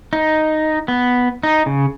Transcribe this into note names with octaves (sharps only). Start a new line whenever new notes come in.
D#4
B3
D#4
C#3